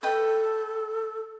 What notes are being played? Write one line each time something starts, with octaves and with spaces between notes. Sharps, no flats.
A4 B4 D#5 G5